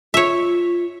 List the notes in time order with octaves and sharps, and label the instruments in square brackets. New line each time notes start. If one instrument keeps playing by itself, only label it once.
[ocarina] F4 [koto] C#5 E5